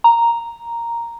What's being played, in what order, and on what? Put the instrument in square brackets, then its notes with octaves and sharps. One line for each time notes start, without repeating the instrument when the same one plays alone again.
[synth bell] A#5